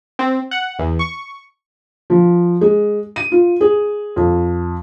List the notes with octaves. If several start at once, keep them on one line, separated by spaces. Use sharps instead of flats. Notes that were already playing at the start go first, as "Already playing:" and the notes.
C4
F#5
E2
C#6
F3
G#3
D#7
F4
G#4
F2